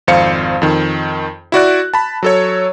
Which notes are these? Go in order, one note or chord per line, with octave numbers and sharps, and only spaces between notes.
G#1 F2 C5 F5 C#7
F2 D#3
E4 F#4 D5 F#6
A5 B5
F#3 A4 C#5